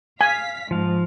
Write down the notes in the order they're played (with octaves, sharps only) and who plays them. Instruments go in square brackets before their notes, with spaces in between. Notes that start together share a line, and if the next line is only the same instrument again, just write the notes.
[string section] F5 B6 [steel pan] G#5
[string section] G#2 [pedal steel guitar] F3 F5